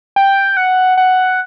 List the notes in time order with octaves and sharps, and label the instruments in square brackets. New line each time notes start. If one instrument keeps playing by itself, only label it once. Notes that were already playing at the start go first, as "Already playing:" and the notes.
[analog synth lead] G5
F#5
F#5